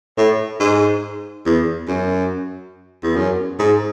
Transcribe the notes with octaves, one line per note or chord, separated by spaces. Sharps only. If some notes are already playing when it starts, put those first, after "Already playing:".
A2
G#2
E2
F#2
E2
F#2
G#2